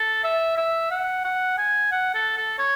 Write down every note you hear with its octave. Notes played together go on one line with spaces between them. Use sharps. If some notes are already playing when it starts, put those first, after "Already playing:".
Already playing: A4
E5
E5
F#5
F#5
G#5
F#5
A4
A4
C#5